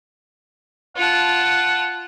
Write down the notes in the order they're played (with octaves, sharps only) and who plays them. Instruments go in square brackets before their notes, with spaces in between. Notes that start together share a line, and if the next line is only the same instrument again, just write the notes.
[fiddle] F4 A5 [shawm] F#5